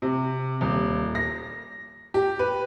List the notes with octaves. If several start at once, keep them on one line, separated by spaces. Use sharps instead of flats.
C3
D#1
A#6
G4
B4